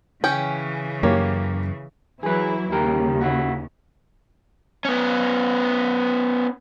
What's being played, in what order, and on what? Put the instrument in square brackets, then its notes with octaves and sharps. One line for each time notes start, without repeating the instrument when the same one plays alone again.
[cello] C#3 E3 [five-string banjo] C#4 G5
[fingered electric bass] F#2 [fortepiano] A#3 G4 C#5
[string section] E3 F#3 E4 [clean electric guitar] G#4 B4
[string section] D#2 C#3 [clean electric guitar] G3 G4 A#4
[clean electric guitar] E4 F#4
[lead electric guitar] B3 C#4